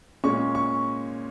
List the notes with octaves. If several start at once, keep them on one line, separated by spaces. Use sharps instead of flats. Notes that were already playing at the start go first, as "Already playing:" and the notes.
A#2 G#3 C#4 C#6
C#6